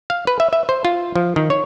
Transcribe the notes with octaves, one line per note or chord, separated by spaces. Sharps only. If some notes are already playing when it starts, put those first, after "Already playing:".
F5
B4
E5
E5
C5
F4
F3
D#3
C#5